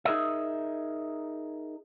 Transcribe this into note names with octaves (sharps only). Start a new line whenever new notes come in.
D#4 G#4 A#4 D#5 E5